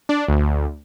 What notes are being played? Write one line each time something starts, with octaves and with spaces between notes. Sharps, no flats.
D4
D2